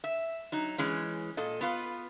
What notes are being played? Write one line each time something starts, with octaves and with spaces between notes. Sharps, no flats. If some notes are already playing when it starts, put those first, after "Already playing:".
E5
F#3 D#4
E3 G#3 C#4
A#2 A4 D#5
B3 F4 B4